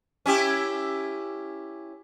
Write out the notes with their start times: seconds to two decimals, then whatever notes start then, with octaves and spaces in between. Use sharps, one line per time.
0.26 C#4 E4 G4